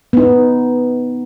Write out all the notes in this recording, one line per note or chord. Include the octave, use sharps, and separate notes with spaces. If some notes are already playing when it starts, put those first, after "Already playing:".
B3 D#4